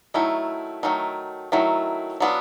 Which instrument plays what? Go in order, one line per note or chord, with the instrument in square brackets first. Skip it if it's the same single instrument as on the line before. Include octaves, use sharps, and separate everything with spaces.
[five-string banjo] D#3 F#3 A3 [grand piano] E4
[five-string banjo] D#3 F#3 A3
[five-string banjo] D#3 F#3 A3 [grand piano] E4
[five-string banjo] F#3 B3 D4 F4